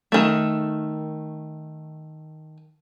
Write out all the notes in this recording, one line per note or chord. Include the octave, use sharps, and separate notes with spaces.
D#3 A3